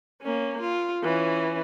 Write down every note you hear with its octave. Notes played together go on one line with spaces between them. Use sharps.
A#3 C#4
F4
E3 C#4